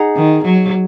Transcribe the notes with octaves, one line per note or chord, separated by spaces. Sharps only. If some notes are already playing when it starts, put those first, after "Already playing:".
Already playing: D#4 G#4 F#5 A#5
D#3
F#3